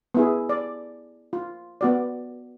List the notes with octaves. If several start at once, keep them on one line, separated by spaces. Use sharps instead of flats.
B3 E4 G#4
D5
F4
B3 F#4 D5